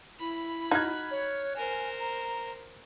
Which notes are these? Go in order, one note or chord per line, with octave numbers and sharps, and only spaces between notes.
E4 B5
D#4 F#4 F6 F#6 G#6
C#5
A#4 C5 G#5
A#5